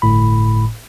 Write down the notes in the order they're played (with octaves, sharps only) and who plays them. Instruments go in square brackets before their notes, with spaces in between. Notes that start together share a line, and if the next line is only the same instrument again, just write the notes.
[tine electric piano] G1 A2 B5